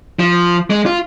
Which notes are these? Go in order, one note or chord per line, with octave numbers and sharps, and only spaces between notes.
F3
G#3
F4